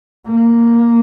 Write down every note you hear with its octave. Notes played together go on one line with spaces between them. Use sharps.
A#3